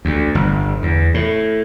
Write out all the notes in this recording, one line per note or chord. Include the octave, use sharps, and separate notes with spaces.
D2
G1
E2
A2